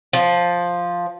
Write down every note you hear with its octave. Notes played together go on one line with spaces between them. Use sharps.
F3